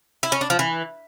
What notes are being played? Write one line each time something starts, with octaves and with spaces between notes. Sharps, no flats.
E4
C#4
D4
F3
E3